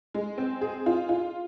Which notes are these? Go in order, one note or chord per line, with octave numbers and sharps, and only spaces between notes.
G#3
C4
G#4
F4
F4